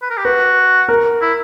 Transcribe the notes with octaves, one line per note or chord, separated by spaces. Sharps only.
B4
A#4
G4
F#4 B4
A#4
E4